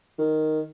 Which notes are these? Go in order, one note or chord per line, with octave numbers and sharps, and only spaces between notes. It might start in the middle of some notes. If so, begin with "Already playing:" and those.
D#3